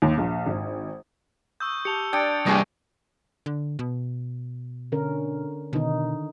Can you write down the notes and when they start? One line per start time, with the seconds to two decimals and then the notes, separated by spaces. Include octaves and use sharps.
0.02 D#2
0.18 A#1
0.46 G#1
1.60 C#6 D#6 E6 G6
1.85 G4 A5 C#7 F7 G7
2.13 D4 D5 G5 D#6 G#6 C#7 D7
2.46 C2 G2 G4 G#4 D#5 C#6 C#7
3.46 D3
3.79 B2
4.92 D3 C#4 A#4
5.73 B2 D3 D#3 D#4